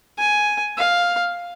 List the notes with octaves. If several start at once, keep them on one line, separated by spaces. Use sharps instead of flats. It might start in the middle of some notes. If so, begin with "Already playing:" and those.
G#5
F5